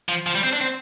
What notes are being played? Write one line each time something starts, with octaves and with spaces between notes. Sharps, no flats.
F3
F3
G3
C4
D4
C4